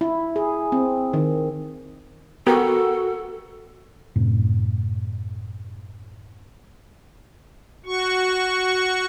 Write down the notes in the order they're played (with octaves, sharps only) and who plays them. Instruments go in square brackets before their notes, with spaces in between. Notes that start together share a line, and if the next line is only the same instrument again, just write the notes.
[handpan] E4
G#4
C4
D#3
[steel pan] B3 G4 A#4 [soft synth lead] F#4 [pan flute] A4
[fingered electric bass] F#2 A2 C3
[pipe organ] F#4 C#6